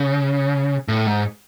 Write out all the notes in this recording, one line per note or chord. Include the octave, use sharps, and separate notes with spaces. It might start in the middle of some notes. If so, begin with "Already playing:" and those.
Already playing: C#3
A2
G#2